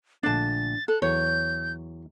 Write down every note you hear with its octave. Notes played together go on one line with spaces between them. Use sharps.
A#1 D3 A3 D4 A5 A6
A4 F#6
E2 E3 F#3 C#5 G6